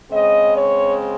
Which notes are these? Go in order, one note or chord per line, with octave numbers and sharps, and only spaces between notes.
C#3 G#3 C4 D#5
C#5